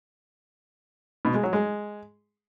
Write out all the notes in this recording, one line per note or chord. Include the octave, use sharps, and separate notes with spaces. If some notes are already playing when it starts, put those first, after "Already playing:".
B2
G#3
F#3
G#3